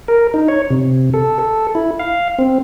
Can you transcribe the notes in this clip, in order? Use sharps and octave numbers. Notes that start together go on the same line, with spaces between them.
A#4
D#4
C#5
C3
A4
A4
E4
F5
C4